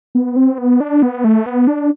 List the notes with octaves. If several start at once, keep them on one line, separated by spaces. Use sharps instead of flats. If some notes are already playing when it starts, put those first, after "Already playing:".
B3
C4
B3
D4
B3
A3
B3
D4